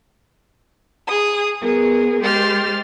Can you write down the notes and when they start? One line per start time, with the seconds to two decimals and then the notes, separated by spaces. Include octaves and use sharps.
1.07 G#4 D#6
1.60 B3 G#4 A#4
2.22 G#3 G4 C5 F6 A6